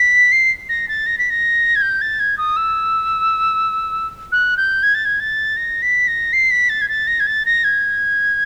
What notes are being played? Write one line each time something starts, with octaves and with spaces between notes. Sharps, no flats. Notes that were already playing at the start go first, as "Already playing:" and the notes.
Already playing: B6
C7
A#6
A6
A#6
B6
A#6
G#6
G6
A6
G#6
D#6
E6
F#6
G6
G#6
A6
G#6
A6
A#6
B6
A#6
C7
B6
A6
G#6
A6
A#6
G#6
A6
A#6
G#6